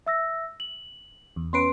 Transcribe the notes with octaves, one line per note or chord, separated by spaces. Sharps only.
E5 E6 A#6
F#7
E2
B3 C#4 B4 C6 C7 D7